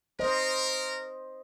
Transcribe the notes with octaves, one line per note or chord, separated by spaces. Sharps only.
A#4 C5 D#5